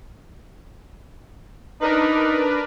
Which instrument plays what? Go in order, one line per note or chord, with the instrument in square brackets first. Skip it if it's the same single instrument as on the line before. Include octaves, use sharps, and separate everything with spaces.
[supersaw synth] D4 A#4 B4 [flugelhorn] D#4